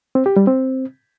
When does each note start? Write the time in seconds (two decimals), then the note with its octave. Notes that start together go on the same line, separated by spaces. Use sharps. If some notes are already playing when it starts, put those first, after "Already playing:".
0.15 C4
0.26 G4
0.36 G3
0.47 C4